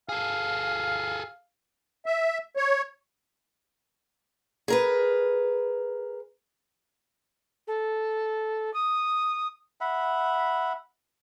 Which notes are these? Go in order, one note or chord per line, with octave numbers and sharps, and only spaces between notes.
G#4 A4 F5
E5
C#5
G#4 A#4 B4
A4
D#6
E5 F#5 B5